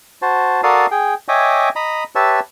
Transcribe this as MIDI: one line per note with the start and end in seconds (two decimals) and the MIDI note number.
0.22 0.61 66
0.22 0.61 72
0.22 0.61 81
0.63 0.86 66
0.63 0.86 69
0.63 0.86 70
0.63 0.86 74
0.63 0.86 77
0.63 0.86 87
0.91 1.14 68
0.91 1.14 79
1.28 1.69 73
1.28 1.69 75
1.28 1.69 76
1.28 1.69 79
1.28 1.69 80
1.28 1.69 86
1.76 2.04 75
1.76 2.04 82
1.76 2.04 83
2.15 2.40 67
2.15 2.40 71
2.15 2.40 73
2.15 2.40 76
2.15 2.40 81
2.15 2.40 88